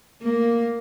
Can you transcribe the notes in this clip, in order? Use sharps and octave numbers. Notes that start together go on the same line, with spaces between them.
A#3